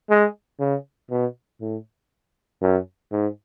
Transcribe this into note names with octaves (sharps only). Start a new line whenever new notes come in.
G#3
C#3
B2
A2
F#2
G#2